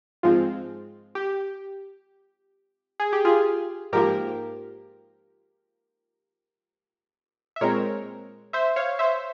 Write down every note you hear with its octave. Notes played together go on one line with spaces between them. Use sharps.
G#2 F3 G#3 C4 F4
G4
G#4
G4
F4 G#4
G#2 F3 A#3 G4 A#4
E5
A#2 G#3 C4 A#4 C#5
C5 E5
C#5 F5
C5 E5